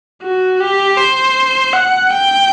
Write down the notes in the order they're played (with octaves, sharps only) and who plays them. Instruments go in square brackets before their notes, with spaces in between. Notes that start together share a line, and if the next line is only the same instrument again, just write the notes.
[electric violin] F#4
G4
C5
F#5
G5